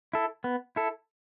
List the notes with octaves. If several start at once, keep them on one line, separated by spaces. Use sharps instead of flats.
E4 A4
B3
E4 A4